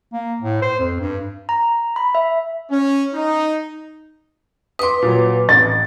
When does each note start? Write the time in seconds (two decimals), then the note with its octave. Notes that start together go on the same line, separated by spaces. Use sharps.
0.13 A#3
0.41 A2
0.62 C5
0.79 F2
1.00 G2
1.49 A#5
1.96 B5
2.15 E5
2.71 C#4
3.14 D#4
4.79 B4 C6 D6 D#6
5.02 A#2 F#3
5.49 A1 A6